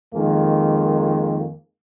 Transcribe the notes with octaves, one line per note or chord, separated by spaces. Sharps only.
F2 D#3 G#3 A#3